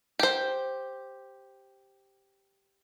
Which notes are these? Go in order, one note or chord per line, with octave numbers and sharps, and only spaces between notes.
G4 C5